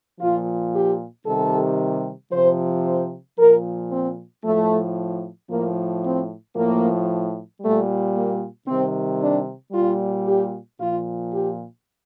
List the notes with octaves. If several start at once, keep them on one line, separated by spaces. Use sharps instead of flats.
A#2 F3 F4
G4
C3 D#3 G3 A4
C3 F3 C5
C5
A#2 F3 A#4
C4
A2 F3 A3
A2 F3 A#3
C4
A2 F3 A#3
A#2 G3 A3
A#3
C3 D#3 G3 C4
D4
G3 F4
A#2
G4
A#2 F3 F4
G4